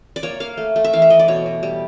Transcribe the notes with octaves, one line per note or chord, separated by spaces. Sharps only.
D5
A#3 C#5
A#3 F5
A3
A3
E5
E3 F5
E5
E3 D#5
D5
B2 C#5
B2
G3